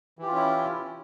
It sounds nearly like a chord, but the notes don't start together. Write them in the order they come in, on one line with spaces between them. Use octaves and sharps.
E3 G4 F4 C#4 E4